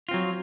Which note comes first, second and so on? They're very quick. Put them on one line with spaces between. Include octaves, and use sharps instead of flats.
F4 C4 F#3